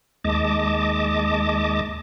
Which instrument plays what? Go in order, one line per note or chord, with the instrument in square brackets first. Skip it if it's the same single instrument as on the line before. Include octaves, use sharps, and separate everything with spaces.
[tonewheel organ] D#2 G#3 D#5 A5 D6